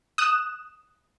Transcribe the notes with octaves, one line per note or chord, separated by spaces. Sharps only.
D#6 F#6 E7